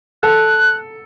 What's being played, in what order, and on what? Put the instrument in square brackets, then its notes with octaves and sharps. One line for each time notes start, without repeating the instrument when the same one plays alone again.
[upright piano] A4 [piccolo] F#6